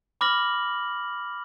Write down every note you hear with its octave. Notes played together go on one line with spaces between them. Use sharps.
B5 D6 F6 A#6 F#7